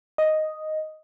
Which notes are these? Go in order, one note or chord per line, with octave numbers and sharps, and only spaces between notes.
D#5